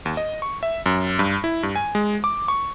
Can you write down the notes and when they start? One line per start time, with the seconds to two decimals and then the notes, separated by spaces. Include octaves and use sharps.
0.06 D#2
0.17 D#5
0.42 C#6
0.63 E5
0.86 F#2
1.19 G2
1.44 E4
1.63 G2
1.75 G#5
1.95 G#3
2.24 D6
2.48 C#6